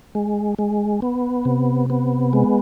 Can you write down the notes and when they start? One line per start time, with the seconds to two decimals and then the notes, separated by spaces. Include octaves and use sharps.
0.15 G#3
0.59 G#3
1.02 B3
1.45 C3
1.90 B3
2.33 G#3